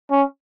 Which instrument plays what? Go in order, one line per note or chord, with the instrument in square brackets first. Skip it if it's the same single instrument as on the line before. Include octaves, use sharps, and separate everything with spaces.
[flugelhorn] C#4